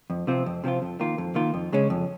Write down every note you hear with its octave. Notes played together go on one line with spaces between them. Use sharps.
F2
C3 F3 C4 F4
F2
C3 F3 C4 F4
F2
D#3 A#3 F4
F2
D#3 A#3 F4
F2
C#3 G#3 C#4
F2